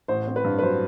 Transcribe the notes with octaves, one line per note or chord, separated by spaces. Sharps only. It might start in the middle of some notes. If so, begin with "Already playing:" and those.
A1 C5
C4
B4
G2
B4
F#3 C5